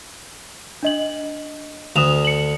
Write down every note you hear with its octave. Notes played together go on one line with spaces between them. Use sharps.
D4 D#5 F#7
D2 D#6 E7 F7
C#7 F#7